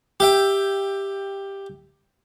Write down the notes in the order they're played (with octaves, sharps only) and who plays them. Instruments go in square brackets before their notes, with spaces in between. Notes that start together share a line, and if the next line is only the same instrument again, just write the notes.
[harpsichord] G4 E5 G5